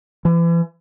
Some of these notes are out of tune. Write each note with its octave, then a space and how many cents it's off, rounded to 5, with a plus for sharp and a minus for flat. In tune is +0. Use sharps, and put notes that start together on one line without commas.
E3 +35